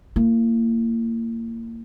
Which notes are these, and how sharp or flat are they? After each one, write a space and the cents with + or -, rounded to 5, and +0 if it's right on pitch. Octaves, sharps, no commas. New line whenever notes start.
A#3 -25 E4 +40